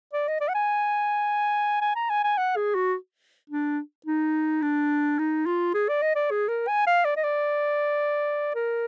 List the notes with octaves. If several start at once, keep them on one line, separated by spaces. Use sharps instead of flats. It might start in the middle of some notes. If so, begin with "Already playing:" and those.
D5
D#5
D5
F#5
G#5
G#5
A#5
G#5
G#5
F#5
G#4
F#4
D4
D#4
D4
D#4
F4
G#4
D5
D#5
D5
G#4
A#4
G#5
F5
D5
D#5
D5
A#4